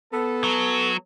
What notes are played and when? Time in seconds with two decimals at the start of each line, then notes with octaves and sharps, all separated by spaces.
0.12 B3 A4
0.44 F#3